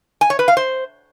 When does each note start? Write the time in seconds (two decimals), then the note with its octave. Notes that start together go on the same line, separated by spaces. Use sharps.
0.21 G#5
0.30 C#5
0.39 B4
0.48 F5
0.57 C5